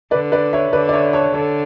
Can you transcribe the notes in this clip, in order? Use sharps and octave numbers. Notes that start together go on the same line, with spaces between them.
D3 B4 D5
B4 D5
C#5 E5
D3 B4 D5
D5
C#5 E5
A4 C#5
D3 A4 C#5